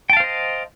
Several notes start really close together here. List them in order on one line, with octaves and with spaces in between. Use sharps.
G5 A5 F5 C5 D#5